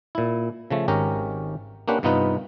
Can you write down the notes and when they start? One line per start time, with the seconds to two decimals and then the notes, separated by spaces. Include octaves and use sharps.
0.15 A#2 E4
0.71 C#3 F3 A3
0.88 G#1 G#2 C#4 G4 A#4 A#5
1.88 A#3 C#4 D4 G4 B4 F#5
2.03 G2 C3 B3 D#4 F4 B4